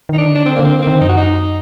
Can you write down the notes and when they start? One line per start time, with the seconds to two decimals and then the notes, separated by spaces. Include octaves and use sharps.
0.09 D#3 D#4
0.18 D4
0.28 D3
0.35 D4
0.46 C4
0.56 A#3
0.59 D3
0.65 C4
0.78 A#3
0.82 D#3 C4
1.01 F#2 D#4
1.09 F#4
1.17 D#4